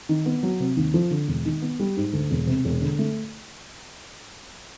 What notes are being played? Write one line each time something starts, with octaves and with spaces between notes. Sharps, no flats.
D#3
B3
F#3
C3
D#2
F3
D3
E1
D#3
B3
G3
G#2
D2
E1
C3
E1
D3
A3